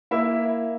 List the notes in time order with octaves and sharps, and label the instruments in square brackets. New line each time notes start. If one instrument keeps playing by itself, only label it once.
[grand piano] A#3 E4 E5